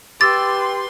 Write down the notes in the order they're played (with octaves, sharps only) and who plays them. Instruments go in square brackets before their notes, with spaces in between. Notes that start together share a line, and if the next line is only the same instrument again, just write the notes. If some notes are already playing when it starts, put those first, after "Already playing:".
[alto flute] G4 [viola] B4 C6 [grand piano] D6 E6 [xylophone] A6